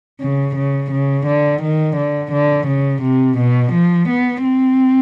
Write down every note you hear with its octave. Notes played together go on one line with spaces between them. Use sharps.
C#3
C#3
C#3
D3
D#3
D3
D3
C#3
C3
B2
F3
B3
C4